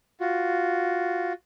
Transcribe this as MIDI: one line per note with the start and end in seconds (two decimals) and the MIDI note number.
0.20 1.33 65
0.20 1.33 66